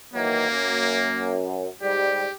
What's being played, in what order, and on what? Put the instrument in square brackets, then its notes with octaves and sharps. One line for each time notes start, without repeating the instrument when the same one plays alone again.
[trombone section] D#3 E3 F#3 [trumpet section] A#3
[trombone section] F#2
[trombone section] G#2 G3 [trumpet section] G4